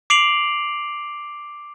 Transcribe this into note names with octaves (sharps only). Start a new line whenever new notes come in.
D6 C7 D7 F7 F#7